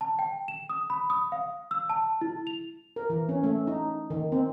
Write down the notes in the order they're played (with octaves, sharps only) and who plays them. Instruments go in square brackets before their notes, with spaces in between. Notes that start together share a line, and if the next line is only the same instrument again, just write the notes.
[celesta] A5
G5
E7
D#6
B5
D#6
F5
E6
A5
E4
F7
[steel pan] A#4
E3
C#4
A3
D#4
D#3
C4